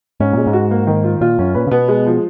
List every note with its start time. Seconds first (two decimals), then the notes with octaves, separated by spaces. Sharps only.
0.20 G#2 C#4
0.33 A#2 G#3
0.46 G#2
0.53 F#4
0.71 A#3
0.87 D#3
1.04 F4
1.21 A#2 F4
1.39 F#2 C#4
1.55 A#2 B4
1.67 C#3
1.71 B2 B3
1.88 G#3
2.06 F3